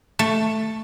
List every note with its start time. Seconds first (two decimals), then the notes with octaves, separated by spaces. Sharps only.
0.19 A3